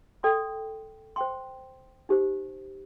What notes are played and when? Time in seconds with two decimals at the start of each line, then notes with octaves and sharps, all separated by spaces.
0.23 A4 D5 G5 C6
1.16 C5 G5 C6
2.09 D#4 G4 C5